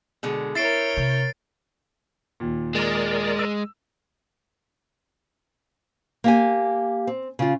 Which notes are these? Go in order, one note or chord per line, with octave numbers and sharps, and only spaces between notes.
B2 D3 G#3
E4 A#4 C#5 G6 A6 C7 D7
C3
D#2 A#2
G#3 A#4 D5
E6
A#3 G4 G#5
C4
C#3 F4